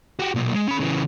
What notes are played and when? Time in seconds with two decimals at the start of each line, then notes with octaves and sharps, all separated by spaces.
0.19 F#4 G4
0.35 B1 A#2
0.54 G#3
0.68 C#4 B5
0.80 C#3 E3